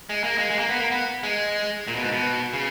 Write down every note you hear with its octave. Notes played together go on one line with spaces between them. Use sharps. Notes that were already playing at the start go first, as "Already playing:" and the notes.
G#3
A#3
G#3
G#3
A#3
B3
A#3
B3
G#3
A#2
B2
G#2
B2
C#3